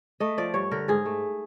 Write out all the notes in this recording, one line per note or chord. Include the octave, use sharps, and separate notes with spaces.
A3 D#5
F3 D5
G2 C#5
D3 A#4
G#2 G#4
A3